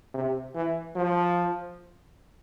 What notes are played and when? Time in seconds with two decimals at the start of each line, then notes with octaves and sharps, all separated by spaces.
0.14 C3
0.55 E3
0.96 F3